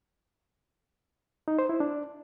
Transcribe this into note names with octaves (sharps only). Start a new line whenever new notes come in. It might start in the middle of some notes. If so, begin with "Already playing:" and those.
D#4
C5
E4
D4